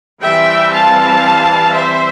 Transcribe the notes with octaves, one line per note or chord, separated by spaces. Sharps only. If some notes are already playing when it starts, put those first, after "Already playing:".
E3 G3 C4 E5 G5
F5 A5
C5 E5